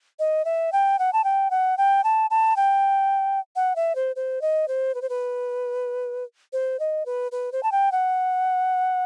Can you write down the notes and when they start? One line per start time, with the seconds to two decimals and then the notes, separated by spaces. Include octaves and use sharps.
0.19 D#5
0.45 E5
0.73 G5
0.99 F#5
1.13 A5
1.24 G5
1.51 F#5
1.78 G5
2.04 A5
2.30 A5
2.56 G5
3.56 F#5
3.76 E5
3.95 C5
4.16 C5
4.42 D#5
4.68 C5
4.95 B4
5.02 C5
5.09 B4
6.53 C5
6.80 D#5
7.06 B4
7.32 B4
7.52 C5
7.63 A5
7.72 G5
7.92 F#5